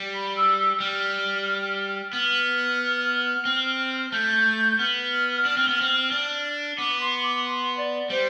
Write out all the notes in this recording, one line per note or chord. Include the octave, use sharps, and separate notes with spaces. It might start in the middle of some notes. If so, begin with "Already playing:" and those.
Already playing: G3
B5
E6
E6
E6
G3 F6
B3 F6
C4
A3 G6
B3 F6
D4
C4
B3
C4
D4
B3 D6
C6
D6
C6
D5
G3 C5